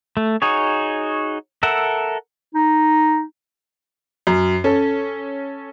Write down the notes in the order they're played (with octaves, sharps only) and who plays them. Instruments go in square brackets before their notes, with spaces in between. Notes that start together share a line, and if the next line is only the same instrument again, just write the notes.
[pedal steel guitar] A3
D#4 F#4 G#4 C#5
A4 A#4 E5 F#5
[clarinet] D#4
[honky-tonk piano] F#2
C#4 A4